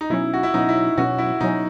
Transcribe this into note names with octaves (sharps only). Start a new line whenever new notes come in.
D#4
B2 F#3 C#4 E4
F#4
E4
B2 F#3 C#4 D#4
E4
B2 F#3 C#4 F#4
E4
B2 F#3 C#4 D#4